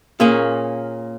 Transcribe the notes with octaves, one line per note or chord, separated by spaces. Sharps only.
A#2 A#3 C#4 G#4